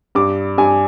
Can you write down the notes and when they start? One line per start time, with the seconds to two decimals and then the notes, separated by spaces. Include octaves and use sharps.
0.15 G2 D6
0.58 G2 G#5